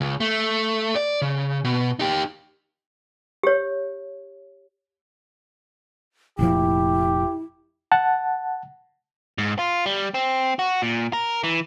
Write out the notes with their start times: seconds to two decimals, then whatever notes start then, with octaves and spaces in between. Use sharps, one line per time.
0.01 C#2
0.20 A3
0.96 D5
1.22 C#3
1.64 B2
1.99 D#4 G4
3.43 G4 C#5
6.39 F1 A#2 F3 E4 G4
7.92 F#5 A5
9.38 G#2
9.59 F4
9.86 G3
10.14 C4
10.59 F#4
10.82 A#2
11.13 A#4
11.44 E3